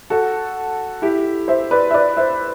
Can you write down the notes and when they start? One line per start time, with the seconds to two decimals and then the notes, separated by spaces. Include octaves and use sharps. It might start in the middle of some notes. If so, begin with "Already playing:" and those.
0.10 F#4 A4
1.02 E4 G4
1.48 C5 E5
1.71 B4 D5
1.91 E5
1.94 B4 D5
2.17 C5 E5